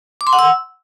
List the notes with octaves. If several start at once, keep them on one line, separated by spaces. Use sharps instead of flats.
D6
C6
F#5
E6